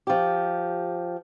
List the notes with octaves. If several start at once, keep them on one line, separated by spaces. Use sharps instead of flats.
F3 G4